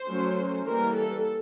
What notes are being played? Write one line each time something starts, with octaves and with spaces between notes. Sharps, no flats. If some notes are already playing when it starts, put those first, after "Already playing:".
Already playing: C5
F#3 A3 C#4
E3 G3 A#3 A#4
A4